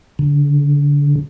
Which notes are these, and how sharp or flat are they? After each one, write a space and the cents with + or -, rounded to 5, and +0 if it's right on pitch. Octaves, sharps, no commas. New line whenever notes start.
D3 -30